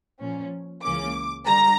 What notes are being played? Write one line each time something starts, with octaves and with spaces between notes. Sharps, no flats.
A#2 F3 C#4
C#2 C#3 E3 A#3 C#4 D6
D3 G3 A#5